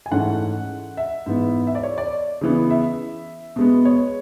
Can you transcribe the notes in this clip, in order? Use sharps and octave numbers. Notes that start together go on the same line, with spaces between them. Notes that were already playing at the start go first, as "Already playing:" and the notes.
G#5
G#2 E3 A3 C#4 F#5
E5
G#2 E3 B3
E5
D5
C#5
D5
C#3 E3 B3
E5
B2 G#3 B3
C#5